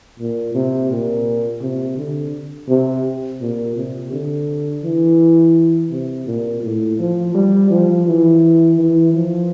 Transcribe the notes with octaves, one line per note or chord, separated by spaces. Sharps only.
A#2
C3
A#2
C3
D3
C3
A#2
C3
D3
E3
C3
A#2
A2
F3
G3
F3
E3
E3
F3